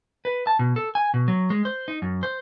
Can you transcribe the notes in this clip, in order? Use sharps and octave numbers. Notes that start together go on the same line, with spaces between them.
B4
A5
B2
A4
G#5
B2
F#3
G#3
C5
D#4
F#2
C5